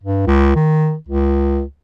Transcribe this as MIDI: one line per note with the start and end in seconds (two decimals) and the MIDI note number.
0.03 0.25 43
0.27 0.52 37
0.56 0.95 51
1.08 1.63 37